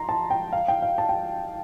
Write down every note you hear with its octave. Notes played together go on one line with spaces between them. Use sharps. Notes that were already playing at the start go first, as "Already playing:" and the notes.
Already playing: A#5 C6
A5
G5
F5
G5
F5
A5
G5